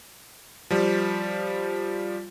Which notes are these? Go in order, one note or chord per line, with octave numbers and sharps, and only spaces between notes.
F3 G3